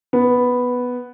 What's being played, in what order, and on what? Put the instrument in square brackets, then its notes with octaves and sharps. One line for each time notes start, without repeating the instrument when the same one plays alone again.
[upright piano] B3